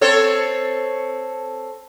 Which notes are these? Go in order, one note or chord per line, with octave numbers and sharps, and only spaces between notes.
C4 A4 C#5